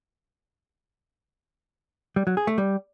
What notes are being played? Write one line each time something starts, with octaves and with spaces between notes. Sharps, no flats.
G3
F#3
G#4
A3
G3